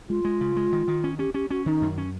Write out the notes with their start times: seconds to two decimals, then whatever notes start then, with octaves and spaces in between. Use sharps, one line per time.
0.09 G#3 F4
0.25 G#3
0.41 C#3
0.56 G#3
0.73 D#3
0.88 D#3
1.04 C#4
1.19 C#4 G4
1.34 C#4 G4
1.50 C#4 F#4
1.66 D#3 D#4
1.82 F#2
1.98 C#4